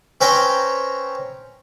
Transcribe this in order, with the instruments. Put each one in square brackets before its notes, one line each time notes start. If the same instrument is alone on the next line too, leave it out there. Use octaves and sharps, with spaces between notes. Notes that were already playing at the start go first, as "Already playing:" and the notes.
[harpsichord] C4 C#4 B4 G5 A#5 C6